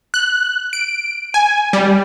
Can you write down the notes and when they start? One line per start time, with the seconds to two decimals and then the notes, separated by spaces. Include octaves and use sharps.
0.14 F#6
0.73 D7
1.34 G#5
1.73 G3